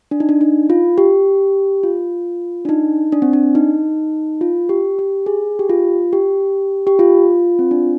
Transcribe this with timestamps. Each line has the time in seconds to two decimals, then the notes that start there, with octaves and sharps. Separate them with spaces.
0.11 D4
0.20 D#4
0.29 D4
0.41 D#4
0.70 F4
0.98 G4
1.83 F4
2.65 D4
2.69 D#4
3.12 D4
3.22 C4
3.33 D4
3.55 D#4
4.41 F4
4.69 G4
4.99 G4
5.26 G#4
5.59 G4
5.70 F4
6.13 G4
6.87 G4
6.99 F4
7.59 C4
7.71 D4